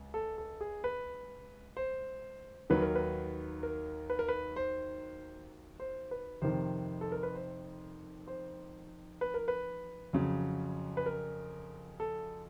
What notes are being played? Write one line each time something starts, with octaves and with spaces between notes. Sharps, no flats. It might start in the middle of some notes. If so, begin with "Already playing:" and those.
Already playing: C#2
A4
A4
G#4
B4
C5
D#2 D#3 F#3 B4
A#4
B4
A#4
B4
A#4
B4
C5
C5
B4
F2 C3 D#3 C5
A4
A#4
B4
C5
C5
B4
A#4
B4
F2 C#3 F#3
B4
A#4
A4